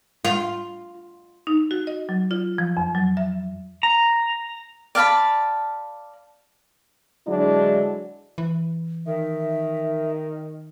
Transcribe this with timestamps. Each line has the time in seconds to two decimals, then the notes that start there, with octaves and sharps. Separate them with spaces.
0.25 F4
1.47 D#4
1.71 F#4
1.87 D#5
2.09 F#3
2.31 F4
2.58 F3
2.77 F2
2.95 F#3
3.17 E5
3.83 A#5
4.95 D5 F5 A5 B5
7.27 D3 F#3 G#3 D4 E4
8.38 E3
9.06 D#3 E5